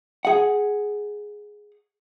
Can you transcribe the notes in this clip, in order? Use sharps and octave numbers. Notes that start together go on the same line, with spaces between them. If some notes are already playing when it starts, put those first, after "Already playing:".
G#4 F#5